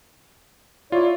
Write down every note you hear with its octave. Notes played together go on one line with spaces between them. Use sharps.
E4 F4 C#5 D5